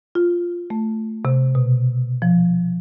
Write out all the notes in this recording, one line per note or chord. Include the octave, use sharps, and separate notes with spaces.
F4
A3
C3
B2
F3